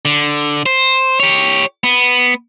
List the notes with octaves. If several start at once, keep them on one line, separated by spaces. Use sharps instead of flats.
D3
C5
G4 C#5
B3